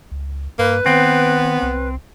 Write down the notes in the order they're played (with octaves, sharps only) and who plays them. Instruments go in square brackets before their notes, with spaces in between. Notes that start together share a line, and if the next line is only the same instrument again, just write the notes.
[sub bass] C#2
[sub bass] G2 [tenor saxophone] A#3 [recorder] B4
[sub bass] D#3 [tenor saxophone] B3 [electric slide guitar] C4
[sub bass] C2